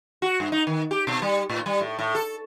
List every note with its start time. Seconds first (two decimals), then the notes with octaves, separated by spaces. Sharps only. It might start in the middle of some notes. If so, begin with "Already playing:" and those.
0.22 F#4
0.40 G2
0.52 D#4
0.67 D#3
0.91 G4
1.07 B2
1.22 G3
1.49 A2
1.66 G3
1.81 A2
1.99 A2
2.15 A4